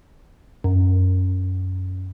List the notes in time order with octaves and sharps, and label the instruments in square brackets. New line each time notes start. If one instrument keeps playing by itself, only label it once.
[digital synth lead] F#2